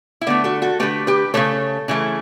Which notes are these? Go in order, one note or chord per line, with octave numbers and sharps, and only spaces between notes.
E4
D3 A3 B3 D4
F#4 A4
F#4 A4
D3 A3 G4 B4
G4 B4
C#3 E3 A3 A4 C#5
C#3 E3 A3